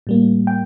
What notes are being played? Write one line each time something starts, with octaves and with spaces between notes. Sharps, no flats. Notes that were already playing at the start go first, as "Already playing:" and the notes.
A2 G3 A#3
G5